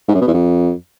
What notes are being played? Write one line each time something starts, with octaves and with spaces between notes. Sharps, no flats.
G#2
F#2
B2
E2
F2